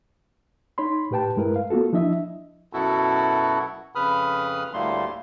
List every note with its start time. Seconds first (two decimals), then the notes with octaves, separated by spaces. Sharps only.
0.78 D#4 C#5 B5 C6
1.11 A2 G4 B4 G5 A5
1.37 G2 G#3 E4 A#4 B4
1.56 F5
1.70 A#3 B3 F4 F#4 A4
1.93 F3 D4 E4 D#5 E5
2.73 F#2 B2 B3 E4 F#4 A4
3.95 F2 C#3 B4 B5 D#6 F6
4.73 D2 A2 G3 A3 A#3 C6